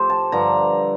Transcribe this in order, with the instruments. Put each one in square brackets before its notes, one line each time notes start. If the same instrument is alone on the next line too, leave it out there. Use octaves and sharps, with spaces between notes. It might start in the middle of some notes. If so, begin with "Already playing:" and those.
Already playing: [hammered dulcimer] A2 F3 G4 A4 C5
A5
G2 D3 F3 A#5